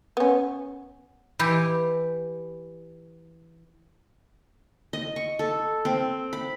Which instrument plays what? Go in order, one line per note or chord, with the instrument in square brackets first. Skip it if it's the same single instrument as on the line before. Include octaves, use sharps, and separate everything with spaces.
[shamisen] B3 C#4
[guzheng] E3 E4 G4
[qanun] D#5
C#6
A4
C4
B5